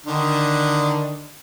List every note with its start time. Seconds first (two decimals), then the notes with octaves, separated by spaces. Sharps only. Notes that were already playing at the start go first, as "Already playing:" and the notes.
0.06 D3 D#3 D4